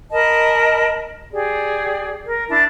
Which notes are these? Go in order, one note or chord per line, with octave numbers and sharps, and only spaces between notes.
A#4 D#5 A5 B5
G4 G#4 D5
A#4
D4 E4 A5